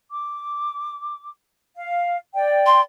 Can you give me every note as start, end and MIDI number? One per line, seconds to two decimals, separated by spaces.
0.11 1.29 86
1.76 2.19 77
2.35 2.82 74
2.35 2.82 79
2.66 2.81 84